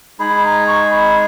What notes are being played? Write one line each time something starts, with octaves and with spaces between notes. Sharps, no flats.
G#3 D#4 G#4 B5
A#5
C#6
B5